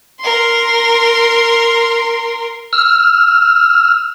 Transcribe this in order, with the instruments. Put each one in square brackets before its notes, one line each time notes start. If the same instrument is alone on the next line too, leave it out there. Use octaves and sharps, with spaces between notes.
[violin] A#4 C6
[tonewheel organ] E6 F6